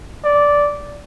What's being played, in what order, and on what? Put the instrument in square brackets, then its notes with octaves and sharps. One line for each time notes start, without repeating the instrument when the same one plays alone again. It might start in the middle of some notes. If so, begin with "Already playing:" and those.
[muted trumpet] D5